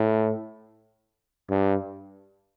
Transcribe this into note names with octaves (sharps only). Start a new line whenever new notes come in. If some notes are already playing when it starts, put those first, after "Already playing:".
Already playing: A2
G2